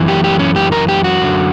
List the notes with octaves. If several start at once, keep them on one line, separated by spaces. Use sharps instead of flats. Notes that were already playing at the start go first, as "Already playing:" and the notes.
Already playing: F#2 E3
G4
G4
C#4
G4
A#4
G4
F#4
F#2 D3